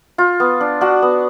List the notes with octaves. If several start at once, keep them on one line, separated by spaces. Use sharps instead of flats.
F4
B3
D4
D4 F#4 F#5
B3